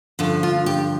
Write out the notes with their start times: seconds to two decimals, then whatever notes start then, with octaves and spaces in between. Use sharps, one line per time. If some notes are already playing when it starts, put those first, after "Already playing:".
0.19 G2 D3 F3
0.43 F4
0.66 G4